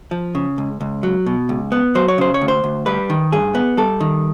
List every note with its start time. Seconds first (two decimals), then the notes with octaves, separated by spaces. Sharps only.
0.11 F3
0.35 C#3
0.58 C#2
0.81 C#2
1.03 F#3
1.26 B2
1.49 C#2
1.72 B3
1.95 F#3 C5
2.08 C#5
2.18 C#3 C5
2.34 C#5
2.41 D2
2.48 C5
2.64 D2
2.86 G3 B4
3.10 D#3
3.32 G2 G#4
3.55 B3
3.77 G3 A4
4.00 D#3